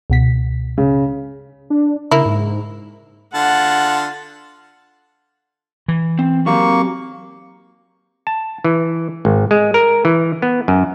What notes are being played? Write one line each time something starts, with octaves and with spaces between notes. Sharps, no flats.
C#2 B2 B6
C#3
D4
C#3 A#3 E4
G#2
D3 F4 F#5 A5
E3
C4
F#3 A#3 C4 G4 C#6
A5
E3
G#1
G#3
A#4
E3
B3
F#2